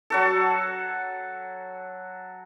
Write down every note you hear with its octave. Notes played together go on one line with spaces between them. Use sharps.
F#3 F#4 A4